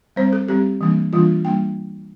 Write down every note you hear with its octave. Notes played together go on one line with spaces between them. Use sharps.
G3 C4 C5
A4
G3 C4 G4
E3 G3 A#3 D4
E3 G3 A#3 D4 F4
G3 A#3 D4 G5